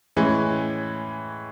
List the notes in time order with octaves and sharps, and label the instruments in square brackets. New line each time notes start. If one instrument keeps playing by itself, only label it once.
[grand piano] A2 E3 G#3 C#4